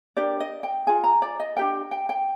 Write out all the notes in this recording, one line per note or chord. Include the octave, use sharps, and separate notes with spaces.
D4 G4 A#4 D5
D#5
G5
F4 G#4 G#5
A#5
D5
D#5
D4 G4 A#4 G5
G5
G5